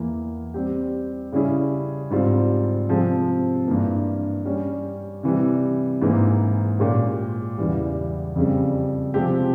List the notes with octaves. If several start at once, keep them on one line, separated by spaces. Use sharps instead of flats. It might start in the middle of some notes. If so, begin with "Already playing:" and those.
Already playing: E2 E3 A#3
G3 C4 G4
C#3 G3 C#4 E4 G#4
G#2 G3 C4 F4
C3 F3 G#3 C4
G2 E3 A#3
G3 C#4 G4
C3 E3 G3
G#2 E3 A#3
A#2 G#3 C#4 G4 A#4
E2 C#3 E3 G3
F2 C#3 G3
C3 F3 G#3 C4 G4